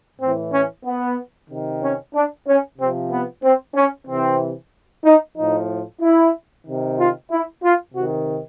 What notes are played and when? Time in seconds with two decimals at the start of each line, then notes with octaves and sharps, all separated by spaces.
0.20 A2 E3 C4
0.53 C#4
0.85 B3
1.49 C3 D#3
1.82 C#4
2.14 D4
2.47 C#4
2.78 C3 F3 C4
3.11 B3
3.43 C4
3.75 C#4
4.07 C3 E3 C4
5.05 D#4
5.36 F3 D#4
5.42 A2
6.01 E4
6.66 C3 D#3
6.98 F4
7.31 E4
7.63 F4
7.94 C3 D#3 F#4